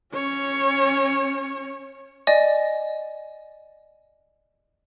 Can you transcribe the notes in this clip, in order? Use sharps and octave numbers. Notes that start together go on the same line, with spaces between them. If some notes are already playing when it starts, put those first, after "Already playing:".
C#4 C#5
D5 D#5 G#5